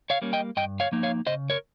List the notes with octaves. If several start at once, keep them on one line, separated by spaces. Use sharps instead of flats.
C#5 F5
G3 A#3 C#4
D#5 G5
G2 D#5 G5
C#5 F5
F3 A#3 D#4
C#5 F5
C#3 C5 D#5
A#4 C#5